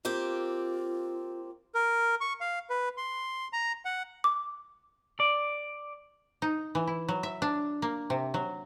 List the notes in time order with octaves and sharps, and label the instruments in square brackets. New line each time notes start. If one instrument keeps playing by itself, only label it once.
[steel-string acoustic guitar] A#3 C4 G4 [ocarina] F4
[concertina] A#4
C#6
F5
B4
C6
A#5
F#5
[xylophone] D6
[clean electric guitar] D5
[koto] D#4
E3
E4
F#3
E5
D4
A#3
C3
F#3